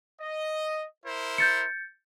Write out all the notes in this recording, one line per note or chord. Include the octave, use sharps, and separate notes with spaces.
D#5
E4 A#4 C5
G6 A6 C#7